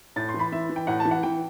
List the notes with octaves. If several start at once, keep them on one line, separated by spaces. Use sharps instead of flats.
A2 A6
C6
E3
B5
E3 E5
E3
G5
A2 F#5
A5
E3
F#5
E3 G5